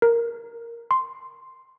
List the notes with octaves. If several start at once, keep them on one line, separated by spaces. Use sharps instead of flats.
A#4
C6